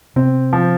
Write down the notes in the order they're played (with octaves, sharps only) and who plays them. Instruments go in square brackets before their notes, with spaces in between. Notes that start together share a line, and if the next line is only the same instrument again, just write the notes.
[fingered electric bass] C3 [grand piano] C4
[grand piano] F3